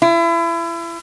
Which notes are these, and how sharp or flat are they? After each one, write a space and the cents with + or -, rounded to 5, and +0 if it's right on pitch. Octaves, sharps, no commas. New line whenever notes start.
E4 +35